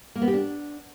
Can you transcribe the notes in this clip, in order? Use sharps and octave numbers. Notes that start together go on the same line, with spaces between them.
A#3
B3
G4
D4